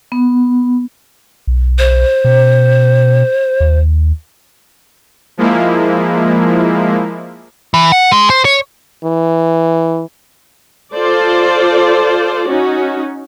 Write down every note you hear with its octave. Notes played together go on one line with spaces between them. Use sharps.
B3
B1
C5
B2
D#2
F3 G#3 A#3 E4
E3
F#5
G#3
C5
C#5
E3
F4 A4 C5 D5
C#4 D#4 F#4